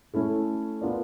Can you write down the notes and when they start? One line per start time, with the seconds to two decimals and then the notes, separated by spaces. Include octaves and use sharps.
0.14 A3 C#4 E4 A4
0.81 B3 D4 F4 A#4 D5